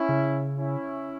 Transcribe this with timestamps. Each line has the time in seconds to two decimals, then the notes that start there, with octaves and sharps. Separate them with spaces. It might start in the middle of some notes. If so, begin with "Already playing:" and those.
Already playing: C#4 E4
0.09 C#3
0.58 C#4 E4